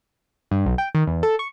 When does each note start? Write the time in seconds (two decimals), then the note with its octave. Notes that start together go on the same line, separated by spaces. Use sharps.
0.51 G2
0.66 B1
0.78 G5
0.95 D#3
1.07 E2
1.23 A4
1.39 C#6